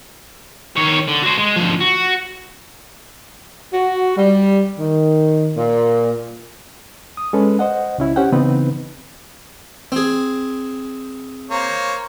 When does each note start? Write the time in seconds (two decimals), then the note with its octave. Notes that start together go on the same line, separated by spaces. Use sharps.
0.76 D#3 C#5
1.08 D3
1.23 F#4 C5
1.38 G#3
1.56 D2 F3
1.81 F#4
3.74 F#4
4.16 G3
4.78 D#3
5.56 A#2
7.17 D#6
7.33 G#3 C#4 A4 B4
7.59 C5 D#5 F#5
7.98 C#2 C#4 E4
8.16 C#4 G4 C5 F#5 G5
8.32 C#3 E3 B3 C4 D#4 B4
9.92 C4 G#4
11.50 A#3 C5 C#5